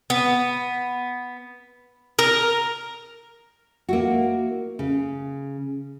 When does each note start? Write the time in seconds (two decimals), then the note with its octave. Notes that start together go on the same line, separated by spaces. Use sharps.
0.10 B3
2.19 A#4
3.89 A#3 E4 F#4
4.79 C#3